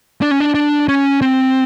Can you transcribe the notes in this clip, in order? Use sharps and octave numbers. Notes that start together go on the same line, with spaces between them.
D4
C#4
D4
D4
C#4
C4